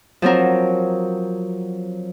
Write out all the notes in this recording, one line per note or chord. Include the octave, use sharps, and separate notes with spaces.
F3 F#3 C4 A#4